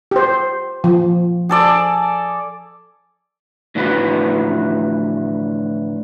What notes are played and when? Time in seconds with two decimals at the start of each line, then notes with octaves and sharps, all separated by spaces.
0.11 G4 C5
0.84 F3
1.49 G#4 A4 D5
3.75 A2 D3 E3 F3 F#4 B4